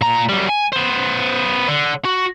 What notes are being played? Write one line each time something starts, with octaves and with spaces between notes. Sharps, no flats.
A#2 A#5
F#2 G3
G#5
B3 C5
D3
F#4